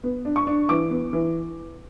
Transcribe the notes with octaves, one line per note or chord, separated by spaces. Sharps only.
B3
D4
C#6
D4
E3 D6
B3
E3